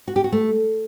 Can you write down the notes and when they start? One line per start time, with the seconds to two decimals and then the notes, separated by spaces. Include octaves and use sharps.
0.08 F#4
0.16 G4
0.24 F#4
0.32 A3